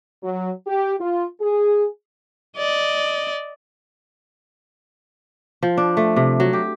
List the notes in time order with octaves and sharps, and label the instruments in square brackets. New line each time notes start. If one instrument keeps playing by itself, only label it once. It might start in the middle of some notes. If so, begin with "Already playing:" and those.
[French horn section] F#3
G4
F4
G#4
[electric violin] D5 D#5
[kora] F3
D4
A3
C3
F#3
G4